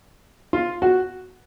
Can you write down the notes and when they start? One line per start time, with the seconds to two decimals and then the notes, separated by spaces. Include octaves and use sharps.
0.53 F4
0.82 F#4